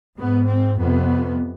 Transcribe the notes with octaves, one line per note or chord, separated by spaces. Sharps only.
G#2 B3
C4
F2 C3 B3